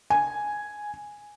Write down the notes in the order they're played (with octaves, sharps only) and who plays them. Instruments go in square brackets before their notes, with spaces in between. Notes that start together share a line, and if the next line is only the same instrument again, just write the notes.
[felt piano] G#5